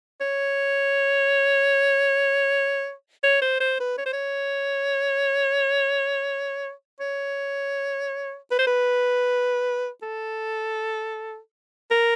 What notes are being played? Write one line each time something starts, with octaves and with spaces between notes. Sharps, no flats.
C#5
C#5
C5
C5
B4
C#5
C5
C#5
C#5
B4
C5
B4
A4
A#4